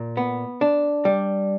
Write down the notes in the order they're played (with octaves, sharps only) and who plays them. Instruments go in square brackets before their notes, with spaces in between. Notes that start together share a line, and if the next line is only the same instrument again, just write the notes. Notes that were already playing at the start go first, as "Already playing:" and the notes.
Already playing: [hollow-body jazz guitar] A#2
B3
D4
G3